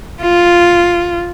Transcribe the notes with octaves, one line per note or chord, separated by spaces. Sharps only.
F4